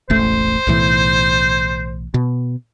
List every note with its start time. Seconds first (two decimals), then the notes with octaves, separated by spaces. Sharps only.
0.10 E1 A1 A3 C5
0.67 B1 A2 E3
2.14 B2